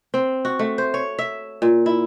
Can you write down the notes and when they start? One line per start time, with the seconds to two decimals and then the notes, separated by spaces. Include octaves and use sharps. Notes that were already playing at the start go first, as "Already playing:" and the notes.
0.14 C4
0.45 F#4
0.59 A3
0.78 C5
0.94 C#5
1.19 E5
1.62 A#2
1.86 E4